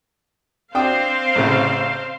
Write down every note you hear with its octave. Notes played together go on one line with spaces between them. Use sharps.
C4 D4 C5 F5 G5 D#6
A1 A2 C#3